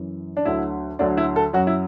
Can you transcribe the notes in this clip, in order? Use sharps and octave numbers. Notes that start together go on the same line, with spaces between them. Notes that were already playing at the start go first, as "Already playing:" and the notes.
Already playing: F#2 E3
D4
D2 D3 F#3 E4
D2 D3 F#3 D4
E4
A4
F#2 F#3 F#4
E4